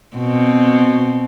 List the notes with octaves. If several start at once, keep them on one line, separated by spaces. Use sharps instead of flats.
B2 C4